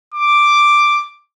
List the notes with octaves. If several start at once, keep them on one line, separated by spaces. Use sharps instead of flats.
D6